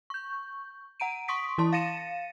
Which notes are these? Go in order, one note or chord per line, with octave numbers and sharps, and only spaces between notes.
C#6 G6
F#5 A#5 D7 D#7
C6 C#6 D#6 B6 D7
E3 E4 A5 C6
F5 A6 A#6 C#7 D#7 E7